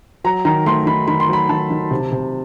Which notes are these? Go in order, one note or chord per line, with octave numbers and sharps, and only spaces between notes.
F#3 A#5
D#3 A#5
A3 C6
D#3 B5
D#3 B5
C6
F#3 B5
D#3 A5
D#3
C3
C3